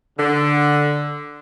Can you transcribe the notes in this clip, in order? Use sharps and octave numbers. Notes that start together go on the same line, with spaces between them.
D3